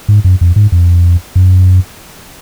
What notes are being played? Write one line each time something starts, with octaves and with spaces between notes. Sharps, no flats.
G#2
F#2
F2
G#2
F2
F#2